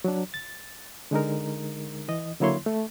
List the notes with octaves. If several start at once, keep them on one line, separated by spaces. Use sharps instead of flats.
F#3 D4
A6
D3 G#3 D#4 A#4
E3 D#5
D3 F#3 A#3 E4 C#5 C6
A3